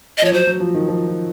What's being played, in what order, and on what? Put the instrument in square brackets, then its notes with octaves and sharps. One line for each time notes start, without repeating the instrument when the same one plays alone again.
[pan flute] D#5
[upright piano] F3 [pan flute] C#5
[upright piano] F#3 [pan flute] C5
[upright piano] F#3
F3
D#3
F3
F3